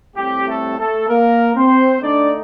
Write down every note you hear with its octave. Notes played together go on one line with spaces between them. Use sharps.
A2 G3 C4 G4
A3 A4
A3 A4
A#3 A#4
C4 C5
D3 A3 D4 D#4 D5